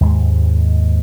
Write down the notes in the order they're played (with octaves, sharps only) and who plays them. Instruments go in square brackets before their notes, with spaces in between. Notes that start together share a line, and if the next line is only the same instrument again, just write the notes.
[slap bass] D#2 G#2 G#3